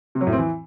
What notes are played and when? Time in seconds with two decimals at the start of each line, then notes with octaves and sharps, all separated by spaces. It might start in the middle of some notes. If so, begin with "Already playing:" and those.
0.15 C3
0.21 F#3
0.27 A2
0.33 C4
0.38 E3